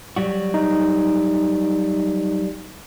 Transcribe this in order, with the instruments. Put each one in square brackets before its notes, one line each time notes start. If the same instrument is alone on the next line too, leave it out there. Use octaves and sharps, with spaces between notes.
[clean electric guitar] F#3 G3 F#4
[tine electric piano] D#4